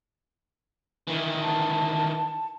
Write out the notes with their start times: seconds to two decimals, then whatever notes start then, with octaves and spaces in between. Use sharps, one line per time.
1.07 D#3 E3
1.42 A5